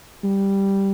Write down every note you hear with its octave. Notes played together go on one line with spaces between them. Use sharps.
G3